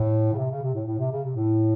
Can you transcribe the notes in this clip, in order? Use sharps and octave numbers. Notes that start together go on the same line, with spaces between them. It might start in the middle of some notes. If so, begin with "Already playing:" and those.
Already playing: A2
C#3
C3
C#3
C3
A2
A2
C3
C#3
C3
A2